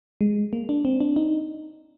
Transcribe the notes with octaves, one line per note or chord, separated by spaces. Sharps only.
G#3
A#3
D4
C4
D4
D#4